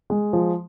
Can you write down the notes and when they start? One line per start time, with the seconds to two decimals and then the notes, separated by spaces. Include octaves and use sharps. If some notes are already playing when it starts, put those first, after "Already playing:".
0.10 G#3
0.33 F3